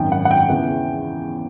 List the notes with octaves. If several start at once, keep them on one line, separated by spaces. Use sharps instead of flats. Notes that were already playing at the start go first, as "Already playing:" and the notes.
Already playing: G#1 F#2 D#3 G5
F#5
F#5
G5
E2 C#3 E3